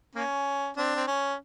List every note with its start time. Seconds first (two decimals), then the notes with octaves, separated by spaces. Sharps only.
0.15 A#3 C#4
0.76 C4 D4
0.96 C4
1.07 C#4